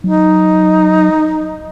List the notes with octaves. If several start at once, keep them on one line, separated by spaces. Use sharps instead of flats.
F#3 D#4